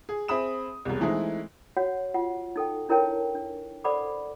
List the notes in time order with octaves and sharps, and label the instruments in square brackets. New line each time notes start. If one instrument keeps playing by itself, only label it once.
[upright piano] G#4
C4 G#4 E5 B5 D#6 E7
E1 C2
E3 G#3 A3 C4 D#4 E4
[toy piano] F#4 C#5 F#5
F4 F#5
D#4 A4 G5
D4 E4 A#4 C#5 G5 A5
D4
A4 C5 D5 F#5 B5 D6